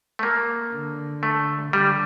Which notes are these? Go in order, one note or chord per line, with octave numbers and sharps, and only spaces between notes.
A3
A#3
D3
A3
D3 G3